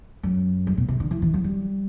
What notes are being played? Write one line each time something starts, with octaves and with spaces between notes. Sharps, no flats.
F#2
G2
B2
C3
D3
E3
E3
F#3
G3